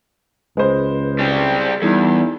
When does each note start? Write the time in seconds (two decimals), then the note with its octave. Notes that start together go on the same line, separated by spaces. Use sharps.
0.57 C#2 G#3 B4 C5
1.19 G3 C4
1.82 E2 G3 D#4 E4 A4